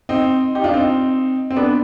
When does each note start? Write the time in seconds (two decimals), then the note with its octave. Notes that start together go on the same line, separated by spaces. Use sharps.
0.09 C4 D#4
0.55 D#4 G4
0.64 D4 F4
0.74 C4 D#4
1.50 C4
1.56 B3 D4